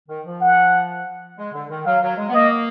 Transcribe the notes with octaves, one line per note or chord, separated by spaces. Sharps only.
D#3
F3
F#5
G#3
D3
D#3
F#3 F5
F#3
G#3
B3
A#3 D#5